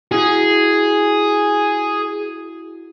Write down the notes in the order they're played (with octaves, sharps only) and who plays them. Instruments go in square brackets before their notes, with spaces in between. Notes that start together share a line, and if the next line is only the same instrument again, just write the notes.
[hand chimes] E4 F#4 [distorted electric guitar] G#4